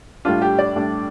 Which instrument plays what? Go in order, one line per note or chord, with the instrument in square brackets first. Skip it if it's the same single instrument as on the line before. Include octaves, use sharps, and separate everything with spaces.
[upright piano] A2 G3 D4 F4
G4
D5
A2 G3 D4